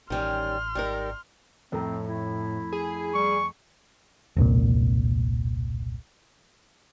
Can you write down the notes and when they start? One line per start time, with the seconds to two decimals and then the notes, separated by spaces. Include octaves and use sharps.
0.10 A1 D#3 G3 C#4 C6 F6
0.75 G#1 G3 D#4 A#4
1.72 F2 A2 A3 C4 A#5
2.09 E4
2.72 G#4
3.14 G3 C#6
4.36 E1 C2 A#2